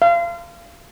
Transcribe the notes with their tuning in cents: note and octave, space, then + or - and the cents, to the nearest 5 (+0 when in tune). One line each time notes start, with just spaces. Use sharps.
F5 -30